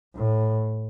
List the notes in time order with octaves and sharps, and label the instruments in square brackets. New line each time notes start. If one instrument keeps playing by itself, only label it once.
[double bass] A2